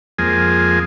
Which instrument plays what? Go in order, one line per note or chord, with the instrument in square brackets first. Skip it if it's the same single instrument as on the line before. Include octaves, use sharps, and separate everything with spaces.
[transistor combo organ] F2 F3 G#3 A#3 G#4 G#5